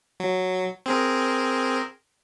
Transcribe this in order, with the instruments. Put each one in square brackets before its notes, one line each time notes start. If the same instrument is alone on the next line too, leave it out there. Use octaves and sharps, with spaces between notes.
[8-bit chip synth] F#3
C4 G#4 A#4